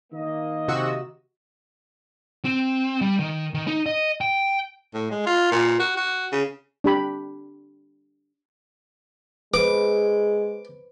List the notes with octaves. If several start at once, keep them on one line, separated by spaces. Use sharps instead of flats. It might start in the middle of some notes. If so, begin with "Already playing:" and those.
D#3 A#3 D#5
C3 F#4 E6
C4
G3
D#3
D#3
D#4
D#5
G5
A2
G#3
F4
A#2
F#4
F#4
C#3
D4 G4 B5
G#3 B4 C5 D6